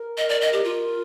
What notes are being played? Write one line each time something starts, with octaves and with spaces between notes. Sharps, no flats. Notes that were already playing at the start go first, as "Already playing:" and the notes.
Already playing: A#4
D#5
D5
D#5
G4
F4